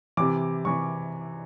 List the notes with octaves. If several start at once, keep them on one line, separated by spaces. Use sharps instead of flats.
C3 E3 D6
C3 E3 C#6